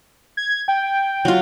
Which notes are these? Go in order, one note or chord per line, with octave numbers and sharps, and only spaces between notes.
G#6
G5
F#3 F4